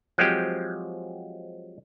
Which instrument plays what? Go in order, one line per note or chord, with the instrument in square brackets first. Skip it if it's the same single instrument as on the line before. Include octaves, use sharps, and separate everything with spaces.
[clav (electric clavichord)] F3 F#3 G#3 C4 G4